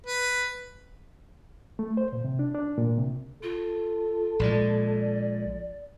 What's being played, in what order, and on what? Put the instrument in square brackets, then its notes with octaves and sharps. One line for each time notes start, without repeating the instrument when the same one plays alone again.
[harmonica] B4
[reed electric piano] A3
C5
A#2
C3
D4
D4
A#2
C3
[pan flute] F4 [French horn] A4
[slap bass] A#1 A#2 G#3 [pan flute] D5